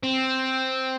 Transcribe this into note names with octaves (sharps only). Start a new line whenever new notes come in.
C4